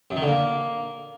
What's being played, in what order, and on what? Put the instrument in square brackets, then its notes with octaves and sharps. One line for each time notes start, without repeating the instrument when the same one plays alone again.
[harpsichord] F#2
D#3
D3
A#3